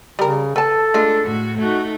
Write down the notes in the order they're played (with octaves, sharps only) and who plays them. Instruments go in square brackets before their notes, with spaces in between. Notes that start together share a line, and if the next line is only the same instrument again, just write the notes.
[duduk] C#3 [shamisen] G3 A#4
[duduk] A4 [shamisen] B4 A5
[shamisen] G#3 A3 F4 [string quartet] D4
[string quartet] A2 F#4
[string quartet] A3 D#4 [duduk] F#4